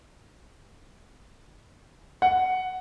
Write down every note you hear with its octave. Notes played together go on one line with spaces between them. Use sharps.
F#5